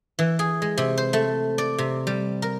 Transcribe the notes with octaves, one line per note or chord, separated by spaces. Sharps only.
E3
G#4
G#3
C3
C5
A3
D5
C3
G3
A#4